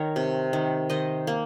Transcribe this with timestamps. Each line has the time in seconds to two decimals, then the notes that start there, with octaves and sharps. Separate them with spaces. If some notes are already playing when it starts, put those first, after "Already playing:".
Already playing: D#3 A#4 C#5
0.16 C3
0.53 D#3
0.90 D#3 C5 D#5
1.27 A#3